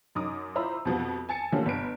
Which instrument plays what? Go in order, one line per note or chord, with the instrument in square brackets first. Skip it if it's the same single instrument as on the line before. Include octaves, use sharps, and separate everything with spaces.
[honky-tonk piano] F#2 D#4 D6 D#6
E4 F4 C5 A#5 B5 E6
F2 B2 F3 G3 B3
G#5 A5 A6 C#7
D3 F3 G3 A3 A#3 C#4
G1 B4 D7